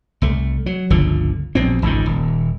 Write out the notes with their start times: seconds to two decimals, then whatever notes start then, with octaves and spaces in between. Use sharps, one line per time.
0.22 C2 A3
0.66 F#3
0.90 G1 C#2 D3 F3
1.55 A#1 B2 C4
1.82 G#1 C#2 G#2 D#3
2.06 D#1